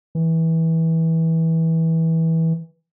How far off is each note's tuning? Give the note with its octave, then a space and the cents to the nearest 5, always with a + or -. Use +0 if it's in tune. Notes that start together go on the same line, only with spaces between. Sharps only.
E3 -20